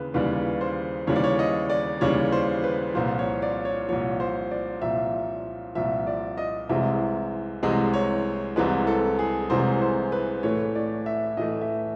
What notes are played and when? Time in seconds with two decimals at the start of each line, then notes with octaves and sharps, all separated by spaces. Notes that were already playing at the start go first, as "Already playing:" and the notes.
Already playing: D#2 C#3 E3 B4
0.14 D#2 C#3 E3 G3 B4
0.61 C5
1.07 D#2 C#3 E3 G3 C#5
1.16 D5
1.24 C#5
1.39 D#5
1.70 D5
2.01 D#2 C#3 E3 G3 C#5
2.32 C5
2.64 B4
2.94 C2 A#2 F3 C5
3.19 C#5
3.42 D5
3.65 C#5
3.89 C2 A#2 F3 C#5
4.20 C5
4.51 D5
4.82 C2 A#2 F3 E5
5.75 C2 A#2 F3 E5
6.07 D5
6.38 D#5
6.69 C2 C3 E3 G#3 E5
7.63 C2 C3 E3 G#3 D#5
7.94 C#5
8.56 C2 C3 E3 G#3 B4
8.87 A4
9.19 G#4
9.50 C2 C3 E3 G#3 C5
9.82 C5
10.12 B4
10.43 A2 E3 A3 C#5
10.75 D5
11.06 E5
11.37 A2 E3 A3 D#5
11.61 E5